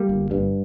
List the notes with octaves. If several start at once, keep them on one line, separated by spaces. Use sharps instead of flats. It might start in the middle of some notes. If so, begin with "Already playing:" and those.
Already playing: G3 A#3
G1
G2